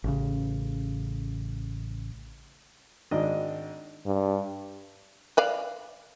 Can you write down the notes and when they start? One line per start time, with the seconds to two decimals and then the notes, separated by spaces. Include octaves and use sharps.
0.04 A1 C#3
3.11 G#1 D4 D#5
4.06 G2
5.37 B4 D5 F5